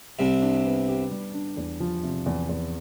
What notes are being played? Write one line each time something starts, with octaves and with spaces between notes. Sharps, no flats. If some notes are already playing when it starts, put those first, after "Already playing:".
C2 C3 G3
D4
B3
G4
G3
D4
E2
F3
C3
E2
E2